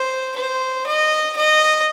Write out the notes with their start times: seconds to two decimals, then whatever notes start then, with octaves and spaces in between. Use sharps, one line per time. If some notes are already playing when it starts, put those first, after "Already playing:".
Already playing: C5
0.36 C5
0.86 D#5
1.36 D#5